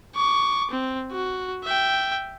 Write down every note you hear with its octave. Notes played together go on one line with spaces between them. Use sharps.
C#6 D6
C4
F#4
E5 G5